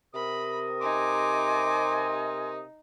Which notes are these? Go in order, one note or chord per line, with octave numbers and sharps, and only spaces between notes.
C3 A#4 B5 D#6
D#4 G#5 C6 D6